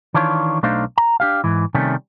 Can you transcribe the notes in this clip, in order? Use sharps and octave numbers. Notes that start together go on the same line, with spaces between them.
D#3 E3 D4 F4 C#5
B1 A3 D4 D#4 C5 F5
A#5
D4 G4 F5
G#2 E3
C3 D#3 G3 A3 C#4